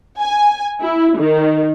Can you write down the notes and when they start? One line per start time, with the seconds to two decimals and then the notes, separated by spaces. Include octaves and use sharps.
0.19 G#5
0.81 E4
1.18 D#3